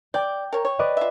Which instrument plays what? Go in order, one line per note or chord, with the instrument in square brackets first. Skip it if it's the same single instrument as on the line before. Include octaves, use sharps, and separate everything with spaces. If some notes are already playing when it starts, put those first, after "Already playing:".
[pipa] D5 [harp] G5
[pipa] A#4 C#5
C#5
[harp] B4 D5 D#5
[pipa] F4 E5